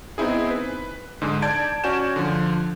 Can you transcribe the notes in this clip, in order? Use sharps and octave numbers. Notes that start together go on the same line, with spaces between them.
B3 C4 D#4 E4 G#4
B4
G#2 D3 G#3
D5 A5 G6 G#6 D7
C#4 F#4 D5 G#5 G6 E7
D3 F3